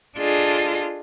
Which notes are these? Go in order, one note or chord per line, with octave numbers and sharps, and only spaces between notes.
D4 F4 G#4 A4 D#5